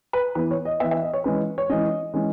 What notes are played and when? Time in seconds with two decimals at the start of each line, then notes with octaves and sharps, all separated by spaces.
0.13 B4
0.35 E3 B3 B4
0.51 C#5
0.65 D#5
0.80 B3 E5
0.84 E3
0.91 E5
1.03 D#5
1.14 C#5
1.24 E3 G#3 C#4 B4
1.58 C#5
1.69 E3 G#3 C#4 D#5
2.14 E3 G#3 C#4